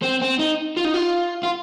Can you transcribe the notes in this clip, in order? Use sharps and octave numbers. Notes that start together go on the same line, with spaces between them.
C4
C4
D#4
F4
D#4
F4
F4